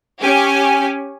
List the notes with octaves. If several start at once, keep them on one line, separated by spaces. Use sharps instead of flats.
C#4 G4 G#5